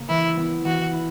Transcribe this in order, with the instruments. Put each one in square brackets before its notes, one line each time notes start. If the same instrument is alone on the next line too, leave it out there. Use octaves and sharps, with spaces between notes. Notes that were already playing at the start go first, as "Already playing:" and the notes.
Already playing: [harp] C#3 A#3
[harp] E3 [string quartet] E4
[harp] B3 E4
[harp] E3 [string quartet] F#4
[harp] E4